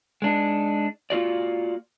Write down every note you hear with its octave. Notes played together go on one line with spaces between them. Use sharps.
G#3 D4 D#4
A#3 F4 F#4 D5